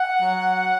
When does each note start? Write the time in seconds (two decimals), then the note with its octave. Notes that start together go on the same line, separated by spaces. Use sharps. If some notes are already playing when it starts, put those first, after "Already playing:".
Already playing: F#5
0.21 F#3